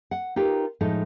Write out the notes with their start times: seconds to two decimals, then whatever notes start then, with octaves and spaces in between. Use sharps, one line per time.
0.11 F#5
0.36 D#4 F4 G4 A#4 B4
0.81 A2 F3 G#3 D#4 A4